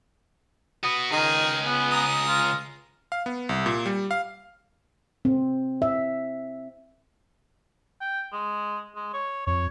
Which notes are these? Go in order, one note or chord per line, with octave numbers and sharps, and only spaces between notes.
F#4 B4 D#6
C#2 D#3 G#4 D#5
B3
A#5 D#6
F4
F5
B3
C2
A#2
G3
F5
C4
E5
G5
G#3
G#3
C#5
F2 C#5